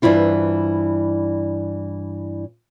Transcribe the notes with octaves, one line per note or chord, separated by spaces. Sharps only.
G2 E3 C4 E4 F4